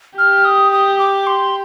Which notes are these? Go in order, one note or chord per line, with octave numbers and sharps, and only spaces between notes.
G4 F6
D#6
D#6
D6
C6